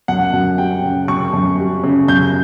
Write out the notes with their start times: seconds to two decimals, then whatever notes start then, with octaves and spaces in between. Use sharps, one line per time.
0.08 F#2 F#5
0.33 F#2
0.58 G3 G5
0.83 C#3
1.08 F#2 C#6
1.34 F#2
1.59 G3
1.84 C#3
2.08 F#2 G6